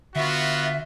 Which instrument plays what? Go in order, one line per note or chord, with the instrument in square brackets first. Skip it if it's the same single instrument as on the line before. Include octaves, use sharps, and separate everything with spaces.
[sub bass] D3 [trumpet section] B3 F4 F#4 [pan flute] E5